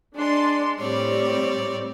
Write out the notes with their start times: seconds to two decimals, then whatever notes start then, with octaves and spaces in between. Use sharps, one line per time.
0.15 G#3 D4 D5 C6
0.79 A2 G3 C4 C#5 D5